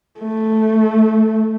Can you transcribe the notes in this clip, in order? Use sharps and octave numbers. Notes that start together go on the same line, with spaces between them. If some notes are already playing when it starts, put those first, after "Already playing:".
A3